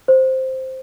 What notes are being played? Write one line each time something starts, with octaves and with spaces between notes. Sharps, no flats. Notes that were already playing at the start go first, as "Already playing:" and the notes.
C5